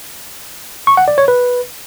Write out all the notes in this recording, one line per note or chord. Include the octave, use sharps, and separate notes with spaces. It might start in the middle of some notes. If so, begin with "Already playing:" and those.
C#6
F#5
D5
C#5
B4